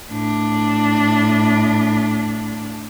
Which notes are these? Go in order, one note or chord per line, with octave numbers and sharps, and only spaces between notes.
A2 D4